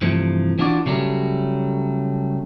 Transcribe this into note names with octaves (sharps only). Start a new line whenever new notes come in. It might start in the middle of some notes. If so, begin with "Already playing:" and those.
C2 G2 E3 F3 A3
E3 D4 F4 F#4 D5
C#3 F#3 G3 A3